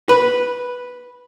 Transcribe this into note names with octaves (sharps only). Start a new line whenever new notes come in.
B4